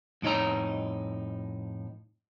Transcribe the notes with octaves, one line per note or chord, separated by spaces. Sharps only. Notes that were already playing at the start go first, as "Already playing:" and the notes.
F2 A2 D#4 C#5 A#5